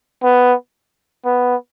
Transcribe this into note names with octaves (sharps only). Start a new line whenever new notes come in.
B3
B3